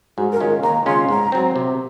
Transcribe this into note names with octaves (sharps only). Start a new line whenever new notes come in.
G#2 F#4
A#4
D#3 G#3 C#4 F4
D#2 A#5
C#3 G#3 C#4 F4 C6
G#2 A#5
F#3 C4
C3